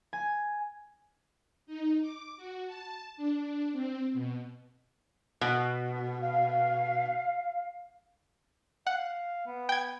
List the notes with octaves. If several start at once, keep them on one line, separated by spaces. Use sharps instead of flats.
G#5
D#4
D6
F#4
A5
D4
C4
B2
B2
F5
F5 F#5
B3
G5 G#6